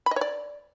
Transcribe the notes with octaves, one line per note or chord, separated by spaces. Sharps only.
B5
D#5
C#5
D5